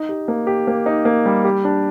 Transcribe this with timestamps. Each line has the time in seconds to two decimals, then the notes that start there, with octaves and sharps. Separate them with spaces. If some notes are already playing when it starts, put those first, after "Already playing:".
Already playing: D#4
0.09 G4
0.28 A#3
0.47 G4
0.67 A#3
0.86 D#4
1.05 A#3
1.26 G3
1.45 G4
1.65 D4